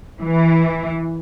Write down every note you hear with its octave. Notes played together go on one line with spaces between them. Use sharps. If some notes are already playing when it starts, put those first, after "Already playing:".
E3